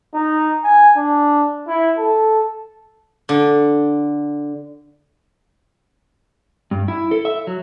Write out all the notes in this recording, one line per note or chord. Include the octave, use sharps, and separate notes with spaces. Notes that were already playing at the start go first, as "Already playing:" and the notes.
D#4
G#5
D4
E4
A4
D3
G2
E4
A4
E5
F#3